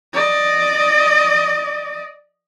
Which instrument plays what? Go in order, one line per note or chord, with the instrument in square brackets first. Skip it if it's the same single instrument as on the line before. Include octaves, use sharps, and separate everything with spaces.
[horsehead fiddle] D5 D#5